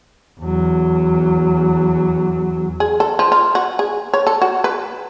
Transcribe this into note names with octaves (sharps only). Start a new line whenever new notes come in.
E2 F#3
G#4
A4
F3
F4
F#4
G#4
C#5
A4
F#4
B4